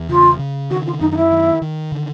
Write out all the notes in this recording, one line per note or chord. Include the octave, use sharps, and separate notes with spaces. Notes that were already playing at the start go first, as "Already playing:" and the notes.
Already playing: E2
C#3 F4
C#3
D#3 F#4
F4
F#2 D#4
D#4
E4
D#3
D#3
D3